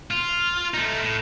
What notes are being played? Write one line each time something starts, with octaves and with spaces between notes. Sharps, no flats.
F4
A3 D#4
A2